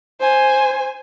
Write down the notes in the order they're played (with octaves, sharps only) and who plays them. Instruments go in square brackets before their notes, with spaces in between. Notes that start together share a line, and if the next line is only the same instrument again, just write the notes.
[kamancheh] C5 G#5